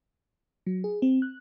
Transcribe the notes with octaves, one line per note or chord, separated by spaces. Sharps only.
F#3
G#4
C4
F#6